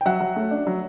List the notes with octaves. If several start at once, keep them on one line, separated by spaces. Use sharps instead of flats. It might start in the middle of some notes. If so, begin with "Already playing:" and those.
G5
F#3 E5 F#5
F#3
A3
D4
F#3